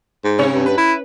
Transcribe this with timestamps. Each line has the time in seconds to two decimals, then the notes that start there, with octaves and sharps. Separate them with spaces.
0.25 G#2
0.38 C3 C#4 C#5
0.54 G2
0.66 B4
0.78 E4